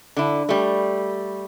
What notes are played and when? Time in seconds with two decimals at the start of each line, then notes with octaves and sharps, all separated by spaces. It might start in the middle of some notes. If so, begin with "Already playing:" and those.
0.17 D3 E4
0.49 G3 A3